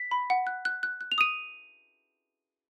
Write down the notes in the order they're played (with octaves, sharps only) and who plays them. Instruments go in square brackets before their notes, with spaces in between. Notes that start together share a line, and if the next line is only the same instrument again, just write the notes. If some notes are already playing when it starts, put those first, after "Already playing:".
Already playing: [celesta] B6
[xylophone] B5
F#5
F#6
F#6
F#6
F#6
[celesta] F7
[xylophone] D#6 [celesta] D#7